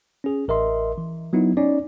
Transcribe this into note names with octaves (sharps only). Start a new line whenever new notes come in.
C#4 G#4
A1 A#4 D#5 E5 C6
E3
F#3 B3 D#4 E4
C#4 D#4 D5